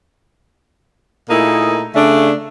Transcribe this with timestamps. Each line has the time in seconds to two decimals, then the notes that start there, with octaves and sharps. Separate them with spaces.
1.29 A#2 A3 A#3 D#4 E4 G#4
1.94 C#3 A3 D4